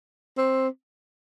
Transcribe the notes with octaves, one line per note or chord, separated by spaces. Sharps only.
C4